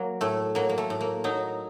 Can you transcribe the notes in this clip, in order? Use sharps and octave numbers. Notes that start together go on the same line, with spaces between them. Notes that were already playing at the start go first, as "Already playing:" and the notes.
Already playing: F#3 A#3
A2 A3
F#3 A#3
A#3
A3
A2
A#3
F#3 D#4